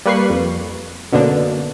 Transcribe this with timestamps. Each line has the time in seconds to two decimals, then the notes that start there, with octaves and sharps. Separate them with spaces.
0.05 G3 A#3 B4 C#6 F#6 C7
0.30 F2
1.12 F#2 B2 D3 A#3 D4